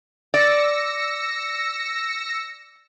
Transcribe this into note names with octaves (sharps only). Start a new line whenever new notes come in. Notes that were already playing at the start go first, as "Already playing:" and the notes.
D5 E6 A#6 C#7